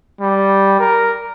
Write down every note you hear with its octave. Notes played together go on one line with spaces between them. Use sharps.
G3
A#4